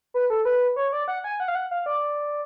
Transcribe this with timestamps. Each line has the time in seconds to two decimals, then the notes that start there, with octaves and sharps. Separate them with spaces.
0.14 B4
0.30 A4
0.45 B4
0.76 C#5
0.93 D5
1.08 F#5
1.24 G#5
1.40 F#5
1.48 F5
1.55 F#5
1.71 F5
1.86 D5